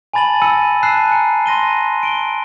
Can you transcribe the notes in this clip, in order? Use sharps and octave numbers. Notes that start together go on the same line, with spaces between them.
G#5 A5 B5 A6 D#7 F#7
G#5 E6 A#6 C#7 D#7
A5 E6 F#6 C7 D#7 E7
G#5 A#5 C#7
C6 A#6 D#7 G7
D7 G7